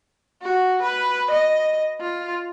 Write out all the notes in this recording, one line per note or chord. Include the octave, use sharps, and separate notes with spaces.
F#4
B4
D#5
F4